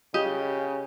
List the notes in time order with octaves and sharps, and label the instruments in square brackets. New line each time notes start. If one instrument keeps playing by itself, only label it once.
[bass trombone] C#3 [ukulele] G4 [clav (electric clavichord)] D#5